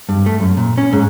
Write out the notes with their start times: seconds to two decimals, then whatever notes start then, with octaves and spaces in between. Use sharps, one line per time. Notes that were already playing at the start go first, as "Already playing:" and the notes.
0.09 G2
0.26 A3
0.40 F#2
0.57 A#2
0.78 C#4
0.93 G#2